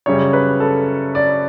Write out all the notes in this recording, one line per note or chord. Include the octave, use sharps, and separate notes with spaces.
F#2 C#3 G3 C#5
B4
A4
D5